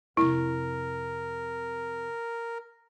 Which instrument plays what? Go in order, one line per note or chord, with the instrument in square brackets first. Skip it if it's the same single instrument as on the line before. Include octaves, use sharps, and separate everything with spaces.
[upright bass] F2 C3 [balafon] E4 [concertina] A#4